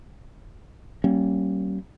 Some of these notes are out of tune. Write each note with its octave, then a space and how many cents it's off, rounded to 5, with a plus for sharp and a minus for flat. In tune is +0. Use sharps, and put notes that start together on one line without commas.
G3 -45 A#3 -10 C#4 -30